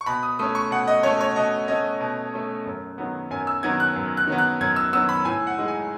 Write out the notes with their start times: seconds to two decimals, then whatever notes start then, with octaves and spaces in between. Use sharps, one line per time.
0.01 C#6
0.06 B2 B5
0.23 D#6
0.39 A3 C#4 D#6
0.55 C#6
0.71 B2 F#5
0.88 D#5
1.03 A3 C#4 C#5
1.20 C#5
1.36 B2 D#5
1.68 A3 C#4 D#5
2.01 B2
2.34 A3 C#4
2.66 F#2
2.98 D#3 F#3 B3
3.31 F#2 G#5
3.47 E6
3.63 D#3 F#3 B3 G#6
3.80 F#6
3.96 F#2
4.17 F#6
4.27 D#3 F#3 B3
4.38 F#6
4.61 F#2 G#6
4.76 E6
4.93 D#3 F#3 B3 E6
5.09 B5
5.25 A2 G#5
5.47 F#5
5.58 G#3 D#4
5.68 G#5